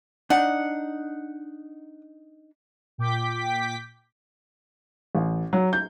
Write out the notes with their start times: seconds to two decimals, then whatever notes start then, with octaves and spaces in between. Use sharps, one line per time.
0.30 D4 D#4 F#5
2.98 A#2 G5 D6 G6 B6
5.15 A1
5.53 F#3
5.73 G6